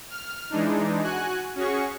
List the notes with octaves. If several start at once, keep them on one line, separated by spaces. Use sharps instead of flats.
F6
E3 G#3 D4 D#4
F#4 G#5 F#6
C#4 F#4 G#4 C#6